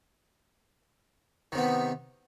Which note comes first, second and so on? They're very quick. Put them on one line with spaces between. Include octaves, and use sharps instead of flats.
D#3 C3 B3